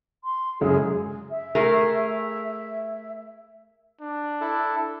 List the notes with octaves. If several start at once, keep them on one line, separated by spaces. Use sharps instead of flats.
C6
F#2 C#3 G#3 G#4
E5
A3 G#4 A#4
D4
E4 A4